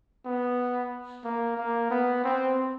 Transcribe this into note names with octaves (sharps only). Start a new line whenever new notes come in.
B3
A#3
A#3
B3
C4